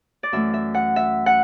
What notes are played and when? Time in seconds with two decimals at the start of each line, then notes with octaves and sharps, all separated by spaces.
0.23 D5
0.32 F#2 E3 A3 E5
0.54 E5
0.74 F#5
0.96 E5
1.26 F#5